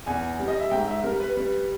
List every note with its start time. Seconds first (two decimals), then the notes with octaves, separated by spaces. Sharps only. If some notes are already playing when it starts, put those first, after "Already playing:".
0.06 E2 G#5
0.39 G3
0.48 D#5
0.60 E5
0.71 G#2 G5
0.87 E5
1.04 G3 A#4
1.20 B4
1.37 G3 B4